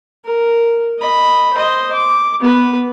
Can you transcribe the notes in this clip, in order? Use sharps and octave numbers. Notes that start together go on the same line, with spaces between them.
A#4
D#5 B5
C5 D#5
D6
B3 B4